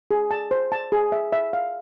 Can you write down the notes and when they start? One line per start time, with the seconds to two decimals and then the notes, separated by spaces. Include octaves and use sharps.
0.11 G#4
0.31 A5
0.51 C5
0.72 A5
0.92 G#4
1.12 E5
1.33 E5
1.53 F5